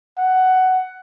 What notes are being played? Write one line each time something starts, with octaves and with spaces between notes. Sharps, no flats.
F#5